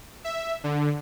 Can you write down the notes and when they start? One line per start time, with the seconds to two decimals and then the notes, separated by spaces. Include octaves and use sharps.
0.24 E5
0.64 D3